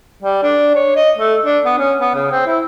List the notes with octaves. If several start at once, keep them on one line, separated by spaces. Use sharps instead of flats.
G3
D4
C#5
D#5
A3
D4
B3
C#4
B3
C#3
C4
E4